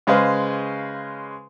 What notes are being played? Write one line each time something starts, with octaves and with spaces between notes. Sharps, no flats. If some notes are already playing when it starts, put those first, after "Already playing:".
C#3 G#3 B4 C5 F5